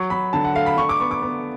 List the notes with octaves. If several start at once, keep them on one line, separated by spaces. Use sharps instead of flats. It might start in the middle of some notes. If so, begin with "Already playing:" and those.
Already playing: F#3 C#6
F#3 B5
D3 A5
F#5
A3 F5
B5
D3 C#6
D6
B3 C#6
D6
B3